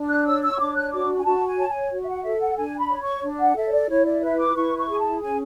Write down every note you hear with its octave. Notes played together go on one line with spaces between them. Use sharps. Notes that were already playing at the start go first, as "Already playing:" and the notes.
Already playing: D4
F#6
C#5 E6
E6
C#6
D4 D6
F#6
F#4 D6
G#5
F#4 A5
G#5
C#5 A5
G#5
F#4
E5
F#5
A4 E5
F#5
D4 G#5
B5
C#5
C#6
D4
F#5
A4 E5
C#5
D5
E4 C#5
D5
B4 E5
D6
E4 C#6
C#6
G#4 G#5
A5
C#4 G#5